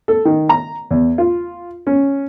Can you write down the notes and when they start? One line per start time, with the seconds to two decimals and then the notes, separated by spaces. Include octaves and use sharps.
0.08 A4
0.25 D#3
0.49 A#5
0.91 E2
1.18 F4
1.87 C#4